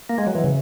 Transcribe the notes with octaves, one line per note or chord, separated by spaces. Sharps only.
A#3
G#3
F#3
E3
C#3